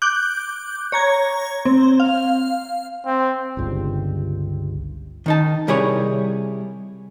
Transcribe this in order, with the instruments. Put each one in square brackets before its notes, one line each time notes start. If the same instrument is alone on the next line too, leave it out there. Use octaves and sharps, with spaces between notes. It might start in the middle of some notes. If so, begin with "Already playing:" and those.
[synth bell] D6 F#6 G6
C#5 A#5 G#6
C4
F5
[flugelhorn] C4
[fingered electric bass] G1 C#2 G2
[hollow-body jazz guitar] D#3 D#4 A5
C3 G3 E4 G#4 A#4 C#5